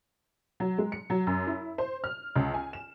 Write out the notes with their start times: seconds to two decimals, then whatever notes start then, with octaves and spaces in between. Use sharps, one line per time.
0.60 F#3
0.78 G#3
0.92 C#7
1.10 F#3
1.27 F#2
1.47 E4
1.78 C5
2.04 F6
2.36 C#2
2.54 G#5
2.73 E7